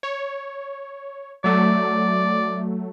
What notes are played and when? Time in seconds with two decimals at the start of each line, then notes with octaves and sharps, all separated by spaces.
0.03 C#5
1.44 F#3 A3 D5